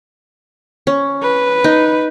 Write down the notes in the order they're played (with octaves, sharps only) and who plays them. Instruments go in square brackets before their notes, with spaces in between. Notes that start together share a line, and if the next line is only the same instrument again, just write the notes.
[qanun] C#4
[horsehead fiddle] B4
[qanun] D#4